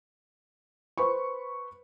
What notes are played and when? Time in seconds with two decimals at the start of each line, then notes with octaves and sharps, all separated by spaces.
0.98 B4 C5 B5 C#6